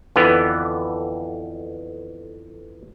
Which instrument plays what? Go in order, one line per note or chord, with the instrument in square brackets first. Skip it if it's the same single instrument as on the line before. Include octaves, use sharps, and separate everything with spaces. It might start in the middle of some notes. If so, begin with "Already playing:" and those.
[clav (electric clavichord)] F2 D3 E3 B3